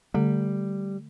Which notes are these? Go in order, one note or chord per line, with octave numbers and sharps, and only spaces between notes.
D3 G3 A3